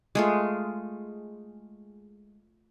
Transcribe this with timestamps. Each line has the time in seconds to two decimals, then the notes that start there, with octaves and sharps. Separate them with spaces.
0.15 G#3 A3 F4